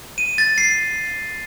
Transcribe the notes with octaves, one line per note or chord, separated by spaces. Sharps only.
D#7
A6
C7